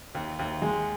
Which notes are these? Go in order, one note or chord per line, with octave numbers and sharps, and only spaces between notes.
D#2
D#2
G#3